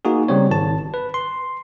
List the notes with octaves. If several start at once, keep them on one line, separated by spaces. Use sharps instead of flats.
A#3 D#4 F#4 G#4
C#3 G3 C4 C#5
G#1 A5
B4
C6